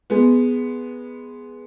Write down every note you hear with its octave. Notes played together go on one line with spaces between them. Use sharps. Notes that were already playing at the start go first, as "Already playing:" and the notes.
G#3 B3